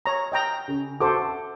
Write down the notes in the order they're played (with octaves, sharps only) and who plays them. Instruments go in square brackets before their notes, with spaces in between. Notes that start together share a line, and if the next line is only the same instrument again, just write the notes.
[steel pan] C#5 A#5
D#5 G5 A#5
[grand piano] C#3
[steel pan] F#4 A4 C5 [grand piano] D6